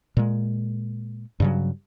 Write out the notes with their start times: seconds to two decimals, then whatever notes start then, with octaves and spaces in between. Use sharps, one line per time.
0.17 A#2 G#3
1.40 G2 C#3 F#3